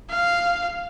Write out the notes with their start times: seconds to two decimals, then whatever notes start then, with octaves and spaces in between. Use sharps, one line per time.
0.10 F5